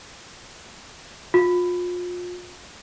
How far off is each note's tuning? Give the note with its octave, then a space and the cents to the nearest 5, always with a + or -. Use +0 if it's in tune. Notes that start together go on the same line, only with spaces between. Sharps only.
F4 +35